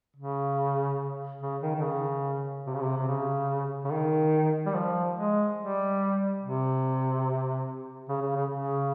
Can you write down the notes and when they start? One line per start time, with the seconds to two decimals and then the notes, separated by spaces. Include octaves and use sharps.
0.16 C#3
1.41 C#3
1.62 D#3
1.75 D#3
1.83 C#3
2.66 C3
2.74 C#3
2.80 C3
2.97 C3
3.07 C#3
3.84 C#3
3.91 D#3
4.66 G3
4.74 F3
5.16 G#3
5.59 G3
6.42 C3
8.09 C#3
8.22 C#3
8.36 C#3
8.50 C#3